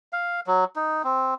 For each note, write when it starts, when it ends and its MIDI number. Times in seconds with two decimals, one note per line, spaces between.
0.13 0.40 77
0.47 0.64 54
0.76 1.02 63
1.04 1.34 60